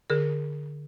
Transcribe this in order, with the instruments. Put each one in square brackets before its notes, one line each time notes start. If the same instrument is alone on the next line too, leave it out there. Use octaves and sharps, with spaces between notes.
[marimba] D3 G#4 A#4